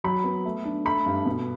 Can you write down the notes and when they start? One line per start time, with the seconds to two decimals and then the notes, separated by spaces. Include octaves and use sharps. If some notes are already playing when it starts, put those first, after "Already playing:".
0.04 F#3 B5
0.24 B3
0.45 A3
0.65 D4
0.85 A3 B5
1.06 G2
1.25 B2